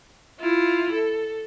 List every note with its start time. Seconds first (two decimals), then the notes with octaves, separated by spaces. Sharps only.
0.40 E4 F4
0.92 A4